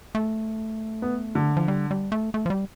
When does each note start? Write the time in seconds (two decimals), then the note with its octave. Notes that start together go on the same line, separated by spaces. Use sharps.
0.15 A3
1.02 B3
1.35 D3
1.57 F3
1.68 G3
1.91 G3
2.12 A3
2.34 A3
2.46 F3
2.50 G3